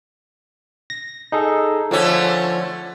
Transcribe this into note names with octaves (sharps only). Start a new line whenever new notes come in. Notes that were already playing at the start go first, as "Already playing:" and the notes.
A#6
D#4 G#4 A4
D3 F3 A3 C#4